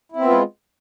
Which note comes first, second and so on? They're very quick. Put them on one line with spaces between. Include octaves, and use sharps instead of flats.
E4 C4 B3 F4 G#3